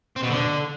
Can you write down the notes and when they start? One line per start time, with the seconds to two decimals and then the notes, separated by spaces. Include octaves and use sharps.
0.16 C4
0.23 B2
0.30 D3